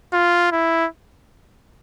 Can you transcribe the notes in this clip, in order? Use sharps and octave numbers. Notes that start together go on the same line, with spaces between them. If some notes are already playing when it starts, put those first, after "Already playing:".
F4
E4